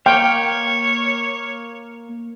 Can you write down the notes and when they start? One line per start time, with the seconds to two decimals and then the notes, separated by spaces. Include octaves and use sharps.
0.06 A#3 C#5 F5 G5